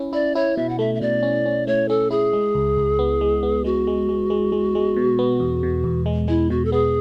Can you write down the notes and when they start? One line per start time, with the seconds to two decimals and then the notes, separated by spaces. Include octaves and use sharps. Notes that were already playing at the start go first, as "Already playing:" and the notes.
Already playing: C#4 E4
0.13 E4 D5
0.35 E4 C#5
0.57 B2 E5
0.69 F#5
0.79 A3 E5
0.95 E5
1.01 B2 D5
1.23 C#4
1.46 C#4
1.67 A3 C#5
1.89 C#4 A4
2.11 E4 G#4
2.33 G#3
2.55 C#2
2.77 C#2
2.99 B3
3.21 G#3
3.43 B3
3.64 G#3 F#4
3.87 G#3
4.09 G#3
4.30 G#3
4.52 G#3
4.75 G#3
4.96 B2
5.19 B3
5.40 E2
5.63 B2
5.84 E2
6.06 G#3
6.28 G#3 E4
6.50 B2 F#4
6.65 A4
6.72 B3 G#4